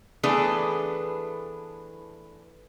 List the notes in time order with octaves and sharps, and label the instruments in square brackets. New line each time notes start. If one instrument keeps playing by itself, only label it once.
[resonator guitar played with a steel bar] E3 A3 B3 D4 G#4